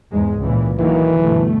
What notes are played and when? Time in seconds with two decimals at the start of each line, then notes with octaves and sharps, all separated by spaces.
0.12 E2 G#2 G#3
0.41 C#2 A#2 E3
0.79 D#3 E3 F#3 A#3
1.21 G1 B2 A3